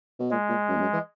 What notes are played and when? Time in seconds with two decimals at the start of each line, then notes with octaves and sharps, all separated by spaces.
0.19 B2
0.31 A#2 G#3
0.49 A#2
0.69 F#2
0.76 E2
0.81 F#2
0.93 E3